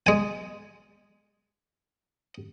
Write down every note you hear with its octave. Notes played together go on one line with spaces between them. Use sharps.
G#3 G#5